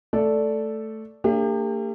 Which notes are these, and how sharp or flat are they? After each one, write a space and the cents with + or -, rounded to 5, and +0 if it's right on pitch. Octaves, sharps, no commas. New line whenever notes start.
A3 +0 A4 +0 D5 -10
A#3 -45 D4 +0 G4 +35